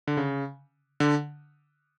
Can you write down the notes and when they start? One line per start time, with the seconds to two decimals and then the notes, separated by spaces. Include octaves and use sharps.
0.07 D3
0.17 C#3
1.00 D3